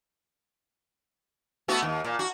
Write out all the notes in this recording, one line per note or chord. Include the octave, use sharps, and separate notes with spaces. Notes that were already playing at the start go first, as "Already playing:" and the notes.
A3 B3 F#4
D#2
A#2
F#4